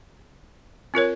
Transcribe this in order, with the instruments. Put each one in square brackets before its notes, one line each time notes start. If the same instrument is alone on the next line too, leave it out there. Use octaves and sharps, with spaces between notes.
[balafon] C4 F4 A#4 C#5